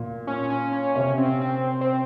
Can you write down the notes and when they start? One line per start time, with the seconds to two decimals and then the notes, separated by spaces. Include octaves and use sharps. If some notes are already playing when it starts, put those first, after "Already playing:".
Already playing: A#2
0.27 C#4
0.50 C#4
0.72 C#4
0.95 C3 C#4
1.18 C4
1.41 C4
1.81 C4